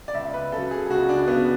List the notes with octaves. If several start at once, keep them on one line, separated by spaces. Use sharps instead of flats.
D5
C#2 E5
B4
C#3 F#3 A4
G#4
G#4
C#2 F#4
D4
C#3 F#3 B3